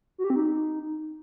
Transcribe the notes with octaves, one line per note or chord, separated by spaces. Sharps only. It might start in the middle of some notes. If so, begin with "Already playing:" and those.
F#4
G4
C4
D#4